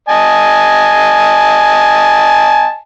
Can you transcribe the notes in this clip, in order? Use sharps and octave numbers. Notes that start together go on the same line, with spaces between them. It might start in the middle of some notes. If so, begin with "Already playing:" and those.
D#5 G#5 A5